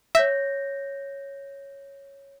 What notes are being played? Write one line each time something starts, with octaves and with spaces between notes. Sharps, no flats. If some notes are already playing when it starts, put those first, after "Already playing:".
C#5 E5 G6 A#6